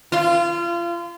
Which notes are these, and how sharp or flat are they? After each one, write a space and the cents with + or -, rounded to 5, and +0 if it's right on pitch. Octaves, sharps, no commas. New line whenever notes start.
F4 -30